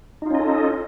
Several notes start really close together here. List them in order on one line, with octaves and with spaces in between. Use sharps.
D#4 F4 C#4 D#5 A4